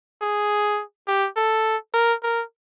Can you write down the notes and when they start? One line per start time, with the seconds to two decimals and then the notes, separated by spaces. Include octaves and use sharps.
0.22 G#4
1.08 G4
1.36 A4
1.94 A#4
2.23 A#4